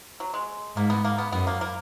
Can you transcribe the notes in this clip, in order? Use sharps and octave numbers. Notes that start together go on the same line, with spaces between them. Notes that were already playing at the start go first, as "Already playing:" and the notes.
F#3
G#3
G#2 A#3
B3
A#3
B3
F#2 B3
A#3
A#3